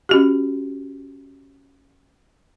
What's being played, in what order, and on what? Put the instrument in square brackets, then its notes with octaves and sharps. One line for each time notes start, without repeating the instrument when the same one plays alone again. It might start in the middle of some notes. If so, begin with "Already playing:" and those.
[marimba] C#4 F#4 G4